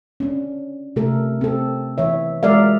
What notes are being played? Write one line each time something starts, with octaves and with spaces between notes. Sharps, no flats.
C#4 D4
C3 A3 A4 A#4
C4 A4
E3 C#5 E5
F#3 G#3 A#4 D5 E5 F5